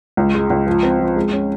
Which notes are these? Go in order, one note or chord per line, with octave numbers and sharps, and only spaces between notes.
C#2
G#3
C#2
F3
C4
F3
G#3
C#4